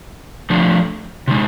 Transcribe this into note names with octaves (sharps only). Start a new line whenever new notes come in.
F3 A3 D4
C3 D#3 G#3